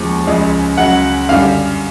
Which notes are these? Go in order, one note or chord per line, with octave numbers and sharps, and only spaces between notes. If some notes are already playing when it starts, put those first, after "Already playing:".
Already playing: D#2 C#3 F3 G#3
C#2 C#3 F3 G#3
C#2 C#3 F#3 F#5
F#2 D3 G3 F5